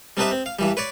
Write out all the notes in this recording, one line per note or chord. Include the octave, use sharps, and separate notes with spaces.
G3 C4 D4 D#4 B4 E5
C4
F5
G2 E3 G3
B4 C#5 D5